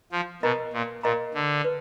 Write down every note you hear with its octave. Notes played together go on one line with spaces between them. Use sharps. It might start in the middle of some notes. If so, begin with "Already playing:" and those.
F3
B2 A#4 D#5 A#5
A#2
A#2 A#4 D#5 A#5
D3
B4